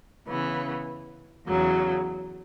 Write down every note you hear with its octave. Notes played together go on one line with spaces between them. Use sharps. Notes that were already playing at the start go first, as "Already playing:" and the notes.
C#3 E3 B3
E2 C#3 F#3